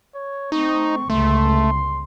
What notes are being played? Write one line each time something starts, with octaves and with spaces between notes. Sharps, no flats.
C#5
A3 C4 D#4 C#6
G1 C#2 A3 C6